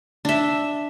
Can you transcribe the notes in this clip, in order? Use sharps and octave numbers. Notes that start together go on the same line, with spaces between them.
D4 E5